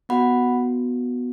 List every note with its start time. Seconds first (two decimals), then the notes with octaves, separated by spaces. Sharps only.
0.09 B3 F#4 F#5 B5